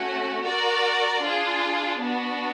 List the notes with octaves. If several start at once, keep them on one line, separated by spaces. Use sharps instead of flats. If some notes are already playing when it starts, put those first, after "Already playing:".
Already playing: A3 C#4 F#4
F#4 A#4 D5
D4 F4 G#4
B3 D4 F#4